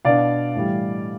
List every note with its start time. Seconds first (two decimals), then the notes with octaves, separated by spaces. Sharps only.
0.05 B2 B3 D4 D5 F5
0.56 A2 E3 G3